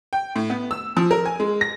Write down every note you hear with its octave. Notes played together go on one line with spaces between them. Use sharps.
G5
A2
B3
E6
F3
A#4
G#5
G#3
A#6